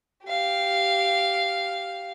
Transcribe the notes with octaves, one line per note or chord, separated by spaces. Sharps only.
G4 F5